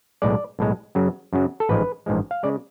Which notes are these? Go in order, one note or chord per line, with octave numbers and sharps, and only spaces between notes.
B1 A2 G#3 D5
B1 A2 G#3
F#2 C#3 F#3
F#2 C#3 F#3
A4
A1 G#2 F3 G#3 B4
A1 G#2 F3 G#3
F5
C#3 G#3 D5